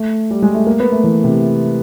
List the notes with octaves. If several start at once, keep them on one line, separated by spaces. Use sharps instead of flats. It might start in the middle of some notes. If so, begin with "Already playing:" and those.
Already playing: A3
G3
G#3
A3
A#3
B3
A3
E3
C3